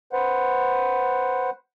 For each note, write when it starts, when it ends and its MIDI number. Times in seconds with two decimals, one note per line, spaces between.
0.13 1.50 71
0.13 1.50 72
0.13 1.50 78